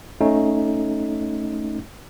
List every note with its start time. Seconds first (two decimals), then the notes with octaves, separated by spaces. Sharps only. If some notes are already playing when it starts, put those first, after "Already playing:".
0.21 A3 C#4 D#4